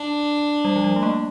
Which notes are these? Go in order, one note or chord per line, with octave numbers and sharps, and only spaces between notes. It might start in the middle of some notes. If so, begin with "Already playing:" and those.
Already playing: D4
G3
F3
G3
A3
A#3